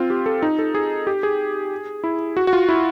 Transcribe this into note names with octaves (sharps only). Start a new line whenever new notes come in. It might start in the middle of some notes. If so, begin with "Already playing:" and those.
Already playing: C4 F4
G4
A4
D#4
A4
G#4
G4
G#4
E4
F#4
F#4
F4
E4